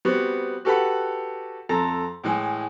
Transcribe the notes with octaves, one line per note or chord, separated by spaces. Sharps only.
G3 B3 C4 F#4
F#4 G4 A4 B4 F#5 B5
F2 A4 A#5
A2 E3 G#3